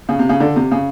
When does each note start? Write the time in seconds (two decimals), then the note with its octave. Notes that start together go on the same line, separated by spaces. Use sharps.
0.09 C#3
0.19 C3
0.29 C#3
0.40 D3
0.56 C3
0.71 C#3